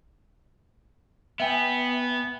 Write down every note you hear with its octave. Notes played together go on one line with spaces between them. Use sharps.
B3 E5 G5 G#5